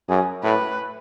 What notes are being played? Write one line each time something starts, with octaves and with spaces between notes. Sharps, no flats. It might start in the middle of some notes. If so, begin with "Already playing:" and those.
F#2 G#4
A2 B4